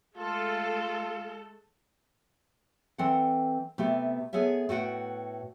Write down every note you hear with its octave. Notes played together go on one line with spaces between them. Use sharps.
G#3 A3 F4 A4
E3 C4 A4 D5 F#5
C3 A3 B3 G4
B3 G#4 A4 C#5 E5
A2 F#4 B4 F#5 G5